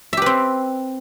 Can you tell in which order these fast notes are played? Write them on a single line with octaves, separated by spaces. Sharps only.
E5 G4 B4 C4